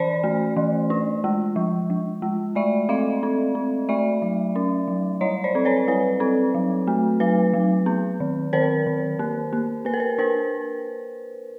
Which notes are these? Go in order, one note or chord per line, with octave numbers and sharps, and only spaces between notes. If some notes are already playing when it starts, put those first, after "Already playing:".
Already playing: E3 C#4 C5 D5
A3
E3
D4
G#3
F3
F3
G#3
A3 D5 E5
C4 D#5 F5
C4
C4
A3 D5 E5
F#3
C#4
F#3
G3 C#5 D#5
C5 D5
C4
B4 C#5
G3 B4
C4
F#3
A3
F#3 B4
F#3
B3
D#3
D#3 A#4 C5
D#3
A#3
A#3
A#3 B4
A#4
B4
D4 A#4 C5